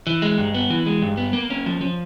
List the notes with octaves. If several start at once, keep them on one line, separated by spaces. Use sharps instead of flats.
E3
G#3
G2
B3
E3
G#3
G2
B3
A#3
C#4
F3
F3